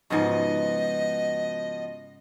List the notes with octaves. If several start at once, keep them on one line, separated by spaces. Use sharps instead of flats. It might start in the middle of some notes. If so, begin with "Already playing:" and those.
G#2 C#3 F3 B3 F#4 D#5